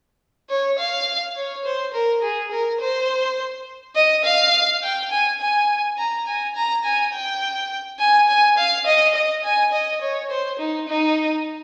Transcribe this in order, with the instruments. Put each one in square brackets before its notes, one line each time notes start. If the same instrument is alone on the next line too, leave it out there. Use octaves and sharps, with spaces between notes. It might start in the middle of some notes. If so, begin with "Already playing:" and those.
[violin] C#5
F5
C#5
C5
A#4
G#4
A#4
C5
D#5
F5
G5
G#5
G#5
A#5
G#5
A#5
G#5
G5
G#5
G#5
F5
D#5
D#5
G#5
D#5
C#5
C5
D#4
D#4